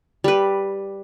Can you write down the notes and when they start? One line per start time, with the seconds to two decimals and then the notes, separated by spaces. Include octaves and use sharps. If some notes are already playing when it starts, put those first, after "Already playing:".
0.24 G3 B4